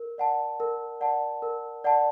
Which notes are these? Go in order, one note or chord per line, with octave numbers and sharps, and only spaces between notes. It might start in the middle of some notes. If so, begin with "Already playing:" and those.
Already playing: A#4
D5 F#5 A5
A#4
D5 F#5 A5
A#4
D5 F#5 A5